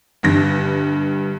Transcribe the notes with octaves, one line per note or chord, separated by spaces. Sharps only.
G1 G2 A#6